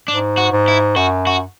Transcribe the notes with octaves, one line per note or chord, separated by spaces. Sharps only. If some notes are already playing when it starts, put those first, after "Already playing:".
G#2 D4
F#4
G#2
E4
F#2 F#4
F#4